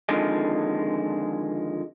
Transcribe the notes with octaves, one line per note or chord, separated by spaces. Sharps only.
F2 D3 D#3 G#3